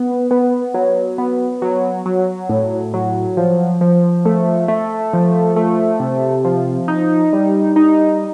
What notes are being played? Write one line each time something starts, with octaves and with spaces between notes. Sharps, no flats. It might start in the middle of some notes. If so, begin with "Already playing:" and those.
Already playing: B3
B3
F#3
B3
F#3
F#3
A2
F#3
F3
F3
A3
A3
F3
A3
C3
F3
D#4
G3
D#4